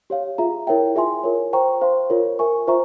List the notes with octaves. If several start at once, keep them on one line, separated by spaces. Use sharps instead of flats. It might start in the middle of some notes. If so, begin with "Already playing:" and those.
G4 C#5 F5
F4 G#4 E5 A#5
E4 A#4 C#5 E5 G5
F4 G#4 E5 G#5 C6
F4 A#4 C#5
C5 G5 A#5 C#6
C5 F5 C6
F4 A#4 C#5
A#4 E5 G#5 C#6
F4 C5 E5 A#5 C#6